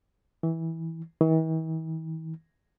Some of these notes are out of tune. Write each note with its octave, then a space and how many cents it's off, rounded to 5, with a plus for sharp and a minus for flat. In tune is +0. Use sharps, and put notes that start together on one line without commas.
E3 -15
E3 -45